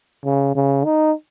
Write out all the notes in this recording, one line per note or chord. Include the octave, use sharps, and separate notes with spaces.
C#3
C#3
D#4